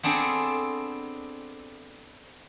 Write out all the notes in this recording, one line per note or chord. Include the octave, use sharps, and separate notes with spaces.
B3 C4 D4 G#4 A4